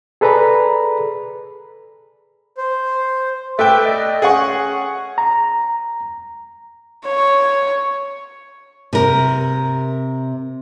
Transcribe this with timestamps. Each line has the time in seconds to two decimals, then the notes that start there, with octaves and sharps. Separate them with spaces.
0.21 G#4 A4 B4 D5 A#5 B5
2.57 C5
3.59 A3 B4 E5 G5 D6
3.86 D5 D#5
4.22 C#4 G#4 F#5 C#6
5.18 A#5
7.06 C#5
8.93 C3 A#4